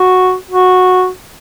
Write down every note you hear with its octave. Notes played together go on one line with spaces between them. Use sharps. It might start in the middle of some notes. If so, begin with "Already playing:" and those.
Already playing: F#4
F#4